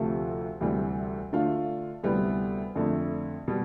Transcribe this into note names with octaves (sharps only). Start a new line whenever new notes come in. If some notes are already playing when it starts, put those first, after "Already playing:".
Already playing: D2 C3 F3 A3
D2 C3 E3 G3
D3 A3 D4 F4
D2 C3 G3 B3 E4
F2 D3 A3 D4
B2 G3